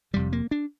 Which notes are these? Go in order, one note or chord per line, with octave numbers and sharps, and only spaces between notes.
F1 F2 C3 G3
A#3
D4